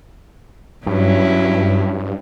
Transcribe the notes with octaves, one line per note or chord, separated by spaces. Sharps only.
G2 F#3 C#4 E4